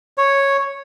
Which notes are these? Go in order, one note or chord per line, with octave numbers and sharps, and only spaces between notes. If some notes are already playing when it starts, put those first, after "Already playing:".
C#5